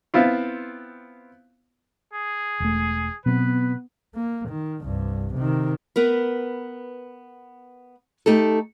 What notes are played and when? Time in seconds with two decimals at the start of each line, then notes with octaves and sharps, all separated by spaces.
0.14 B3 C4 E4 F4
2.13 G#4
2.60 E1 A3
3.26 B2 F#3 B3 C4 B4
4.15 A#3
4.49 D#3
4.83 C2 G2
5.34 C3 D#3
5.96 B3 A#4 B4
8.26 A3 D#4 G4 A4